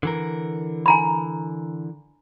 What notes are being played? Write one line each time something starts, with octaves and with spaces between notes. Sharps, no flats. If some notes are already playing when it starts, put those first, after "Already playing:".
D3 E3 A#4
G#5 A#5 B5